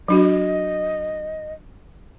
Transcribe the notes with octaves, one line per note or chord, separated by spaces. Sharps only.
F#3 D4 F#4 D#5